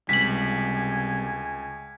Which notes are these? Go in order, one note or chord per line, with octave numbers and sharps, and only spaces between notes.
C#2 C3 G3 G#5 B6 F#7